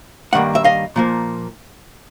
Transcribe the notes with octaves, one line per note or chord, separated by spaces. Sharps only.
G2 D#3 G3 A#3 F#5
E5
D#5 F5
A#2 F3 A#3